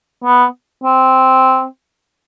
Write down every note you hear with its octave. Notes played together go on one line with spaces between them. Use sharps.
B3
C4